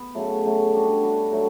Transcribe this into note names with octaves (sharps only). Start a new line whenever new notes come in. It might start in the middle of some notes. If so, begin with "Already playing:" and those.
Already playing: B3
C#3 F#3 A3
C#3 F#3 A3
G3 D4 F#4
G3 D4 F#4
D3 F#3 A3